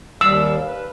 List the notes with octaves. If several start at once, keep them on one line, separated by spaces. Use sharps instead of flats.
D#2 G3 F5 E6
B4